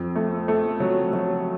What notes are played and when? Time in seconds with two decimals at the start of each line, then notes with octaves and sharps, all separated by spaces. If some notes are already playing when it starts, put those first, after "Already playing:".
Already playing: F2
0.16 A3
0.48 A3
0.80 F#3
1.13 F#3